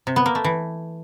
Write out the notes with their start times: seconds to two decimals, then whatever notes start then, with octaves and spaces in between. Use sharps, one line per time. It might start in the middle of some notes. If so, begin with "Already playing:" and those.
0.07 C3
0.16 B3
0.26 A#3
0.35 A3
0.44 E3